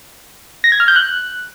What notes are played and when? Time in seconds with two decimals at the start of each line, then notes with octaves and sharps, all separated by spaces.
0.64 A#6
0.72 G#6
0.80 F6
0.88 G6
0.96 F#6